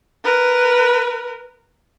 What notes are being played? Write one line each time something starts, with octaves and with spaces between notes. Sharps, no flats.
A#4 B4